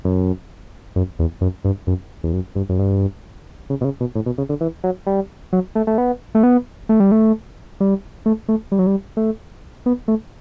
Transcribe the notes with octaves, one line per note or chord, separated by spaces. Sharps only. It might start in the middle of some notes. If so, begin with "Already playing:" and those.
F#2
F#2
E2
F#2
G2
F#2
E2
F#2
G2
F#2
G2
C#3
B2
C#3
B2
A2
B2
C#3
D3
E3
F#3
G3
F#3
A3
A3
B3
A3
B3
A3
G3
A3
G3
A3
A3
G3
F#3
G3
A3
B3
A3